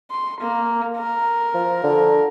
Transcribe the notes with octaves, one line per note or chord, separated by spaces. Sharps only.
C6
A#3
A#4
F3
D3